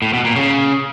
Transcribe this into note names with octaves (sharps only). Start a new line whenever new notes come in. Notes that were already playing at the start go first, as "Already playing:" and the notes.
A2
B2
A#2
C#3